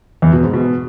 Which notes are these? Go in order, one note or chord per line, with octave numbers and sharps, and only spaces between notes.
E2
B2
G#2
B2